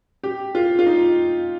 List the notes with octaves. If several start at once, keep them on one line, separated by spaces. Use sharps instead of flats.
G4
F4
F4
D#4